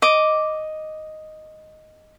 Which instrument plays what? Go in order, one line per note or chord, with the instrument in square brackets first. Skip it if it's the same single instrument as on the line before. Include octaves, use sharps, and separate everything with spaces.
[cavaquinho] D#5 D6